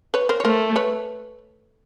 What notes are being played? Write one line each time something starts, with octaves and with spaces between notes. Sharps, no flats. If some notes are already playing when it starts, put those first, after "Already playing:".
B4 C#5
A#4 C5
C#5
A3 A#4 C5
B4 C#5